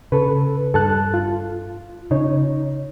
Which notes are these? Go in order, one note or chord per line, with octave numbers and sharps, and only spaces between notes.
C#3 A4 B4
G2 A4 A5 F#6
F4
C#3 D#4 C#5